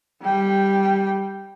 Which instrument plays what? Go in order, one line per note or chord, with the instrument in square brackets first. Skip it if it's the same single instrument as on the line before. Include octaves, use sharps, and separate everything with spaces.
[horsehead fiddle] G3 G5